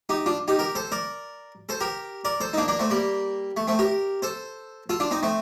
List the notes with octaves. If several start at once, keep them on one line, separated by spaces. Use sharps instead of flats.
D#4 G4
D4 F4
D#4 G4
G4 A#4
A4 C5
A#4 D5
A4 C5
G4 A#4
A#4 D5
A4 C5
D#4
A#3 D4
A#3 D4
A3 C4
G3 A#3
A3
A3 C4
G4 A#4
A4 C5
F4 A4
D4 F4
C4 D#4
A3 C4